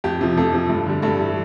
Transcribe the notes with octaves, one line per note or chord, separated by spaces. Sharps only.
F2 G4
C3 F3
F2 A4
C3 F3
G2
D3 G3
G2 A4
E3 G3